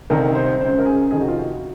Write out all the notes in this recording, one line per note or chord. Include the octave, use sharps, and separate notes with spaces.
C2 C3 D#3 A#4
C5
C#2 C#3 C5
A#4
G#4
F2 C3 D#3 G#4
F#4
F4
F#4